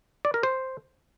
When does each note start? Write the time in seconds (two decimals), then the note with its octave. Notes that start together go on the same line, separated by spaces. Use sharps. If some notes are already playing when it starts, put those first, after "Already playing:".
0.25 D5
0.34 A#4
0.43 C5